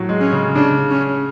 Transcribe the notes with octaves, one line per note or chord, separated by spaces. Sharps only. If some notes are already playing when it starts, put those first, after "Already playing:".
Already playing: A2 F#3
G#3
C#4
C#3
C#3 D4
C#4